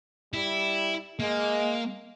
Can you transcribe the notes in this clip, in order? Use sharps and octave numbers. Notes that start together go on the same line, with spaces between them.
G3 E4
G#3 A#3